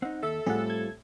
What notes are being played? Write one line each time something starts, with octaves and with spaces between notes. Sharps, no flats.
C4 D#4 F#5
D#2 A4 E5
A2 G3 C4 F4 G#4 F#5
G#6